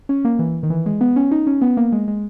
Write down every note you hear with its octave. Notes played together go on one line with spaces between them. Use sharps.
C#4
A#3
E3
D#3
E3
G#3
B3
C#4
D#4
C#4
B3
A#3
G#3
G#3